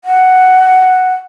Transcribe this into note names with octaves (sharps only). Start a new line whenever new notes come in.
F#5